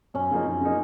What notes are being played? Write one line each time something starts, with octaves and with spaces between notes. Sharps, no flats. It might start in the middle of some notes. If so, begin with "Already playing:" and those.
F#2 C#4
C#3 F3 A#3 D#4
F#2
C#3 F3 A#3 D#4